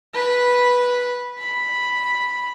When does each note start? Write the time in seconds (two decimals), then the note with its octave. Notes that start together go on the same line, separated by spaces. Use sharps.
0.15 B4
1.39 B5